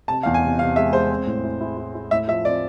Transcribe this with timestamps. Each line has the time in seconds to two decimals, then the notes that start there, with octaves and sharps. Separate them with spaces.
0.08 C3 A5
0.23 E2 F5
0.34 G#5
0.43 C3
0.59 C3 F5
0.76 G#3 E5
0.93 G#3 C5
1.10 C4
1.26 A2
1.44 E4
1.61 E4
1.77 E4
1.95 E4
2.11 A2 E5
2.28 F3 E5
2.45 C4 D5